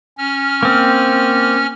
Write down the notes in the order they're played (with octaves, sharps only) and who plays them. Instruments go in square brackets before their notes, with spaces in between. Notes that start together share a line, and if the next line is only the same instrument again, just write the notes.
[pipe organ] C#4 F6
[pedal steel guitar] A#3 C4